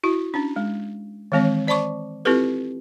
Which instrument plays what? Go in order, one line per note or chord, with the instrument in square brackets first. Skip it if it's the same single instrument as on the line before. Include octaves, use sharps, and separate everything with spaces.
[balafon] E4 F#4
C#4 D4
G#3
D#3 E3 G#3 C4 C#5
C5 D5 A5 B5 C#6 D6
C4 E4 F4 G4 A4 B4